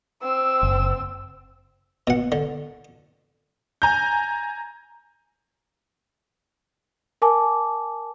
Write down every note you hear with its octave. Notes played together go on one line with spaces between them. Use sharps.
C4 E6
F#1
B2 F#5
D3
G#5 A#5 G6
A#4 G#5 A5 D6